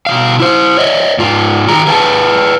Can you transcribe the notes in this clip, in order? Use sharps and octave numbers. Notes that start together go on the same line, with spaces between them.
B2 D#3 F5
E4 C5
C#5 D#5 E5
G#2 F4
D#3 G#4 A#5
G#4 B4 F5 G5 A5